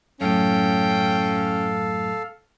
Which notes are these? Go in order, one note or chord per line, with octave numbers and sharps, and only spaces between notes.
F#2 A2 C#4 A4 F5 G5